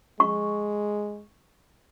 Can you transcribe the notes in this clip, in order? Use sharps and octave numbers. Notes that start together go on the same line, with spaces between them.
G#3 C#6